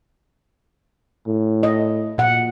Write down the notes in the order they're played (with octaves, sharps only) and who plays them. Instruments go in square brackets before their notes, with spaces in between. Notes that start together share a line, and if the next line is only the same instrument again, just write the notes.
[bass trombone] A2
[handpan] D#5
A#2 F#5